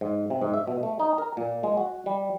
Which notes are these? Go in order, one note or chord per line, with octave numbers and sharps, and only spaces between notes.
G#2
C3
G#2
E5
B2
A3
D#4
A#4
A#2
G#3
F#4
G3